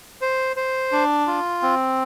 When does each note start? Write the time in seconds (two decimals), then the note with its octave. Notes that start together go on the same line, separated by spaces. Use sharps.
0.22 C5
0.56 C5
0.92 D4
1.27 F4
1.62 C4